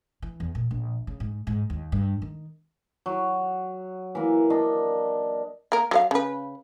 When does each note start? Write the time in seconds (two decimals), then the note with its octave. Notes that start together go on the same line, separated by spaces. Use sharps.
0.22 E3
0.40 E2
0.55 A#2
0.71 A#1
1.07 C#3
1.20 G#2
1.47 G#2
1.70 D#2
1.92 G2
2.22 D#3
3.06 F#3
4.15 E3 A#3
4.50 D4 D#5
5.72 A#3 A#4
5.91 F#3 A#4 F5
6.11 C#3 B4